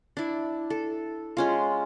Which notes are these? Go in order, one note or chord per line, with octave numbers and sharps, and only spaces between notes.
D4 E4
A4
G#3 C#4 F4